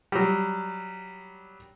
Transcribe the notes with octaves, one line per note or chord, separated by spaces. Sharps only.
F#3 G3